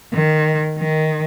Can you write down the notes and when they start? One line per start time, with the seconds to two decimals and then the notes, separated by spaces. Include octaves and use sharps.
0.13 D#3
0.78 D#3